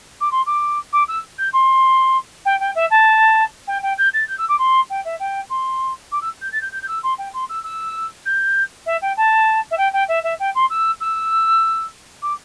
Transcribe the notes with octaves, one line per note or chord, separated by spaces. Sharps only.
D6
C6
D6
D6
E6
G6
C6
G5
G5
E5
A5
G5
G5
G6
A6
G6
E6
D6
C6
G5
E5
G5
C6
D6
E6
G6
A6
G6
G6
G6
E6
C6
G5
C6
E6
E6
G6
E5
G5
A5
E5
G5
G5
E5
E5
G5
C6
E6
E6
D6